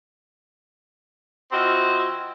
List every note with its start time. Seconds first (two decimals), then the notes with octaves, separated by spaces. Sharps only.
1.52 F3 C4 E4 F#4 D#5